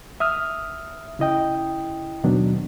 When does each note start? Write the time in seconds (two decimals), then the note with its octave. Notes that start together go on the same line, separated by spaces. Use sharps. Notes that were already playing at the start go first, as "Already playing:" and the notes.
0.20 E5 D#6 F6
1.19 C#3 E4 D#5 G5
2.23 D#2 B2 D#3 F#3 B3 D4